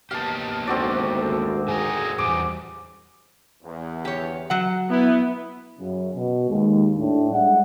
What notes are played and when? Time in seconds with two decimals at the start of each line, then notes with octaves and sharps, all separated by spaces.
0.11 A#3 B3 G4 F5 A5
0.67 G#1 D2 C4 F#4 D5
1.68 A2 A3 G#4 A#4
2.18 E2 G3 D6 D#6
3.63 E2
4.05 G4 C#5
4.50 F#3 F#5
4.89 B3 E4
5.79 F#2 C#3
6.15 B2
6.50 D#2 G#3
6.98 A2 D4
7.32 G3 G#3 D5 E5 F#5